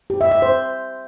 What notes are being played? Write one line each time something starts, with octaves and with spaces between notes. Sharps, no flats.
G4
E5
E5
C5